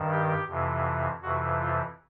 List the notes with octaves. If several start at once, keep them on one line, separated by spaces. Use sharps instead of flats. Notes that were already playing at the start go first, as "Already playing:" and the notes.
Already playing: G2 D#3
G4
F2 C3 E3
F2 C3 E3 F#4
F4